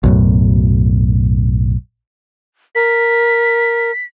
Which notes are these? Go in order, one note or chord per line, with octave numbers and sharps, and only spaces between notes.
B1 F#2 A2
A#4 B6